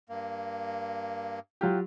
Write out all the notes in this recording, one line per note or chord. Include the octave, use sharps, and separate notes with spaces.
G2 A#3
F#3 F4 G4